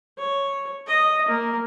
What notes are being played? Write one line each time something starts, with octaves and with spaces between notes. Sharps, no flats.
C#5
D#5
A#3